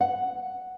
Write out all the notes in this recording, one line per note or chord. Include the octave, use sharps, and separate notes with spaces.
F#5